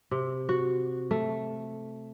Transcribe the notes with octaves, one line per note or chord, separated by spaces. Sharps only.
C3
F#4
A3